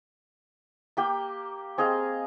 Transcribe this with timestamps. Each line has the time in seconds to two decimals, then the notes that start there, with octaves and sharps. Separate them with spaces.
0.97 A#3 G4 G5
1.78 C4 G#4 D#5 F5